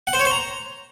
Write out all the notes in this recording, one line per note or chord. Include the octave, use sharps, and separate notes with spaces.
F#5
C5
C#5
C5
A#5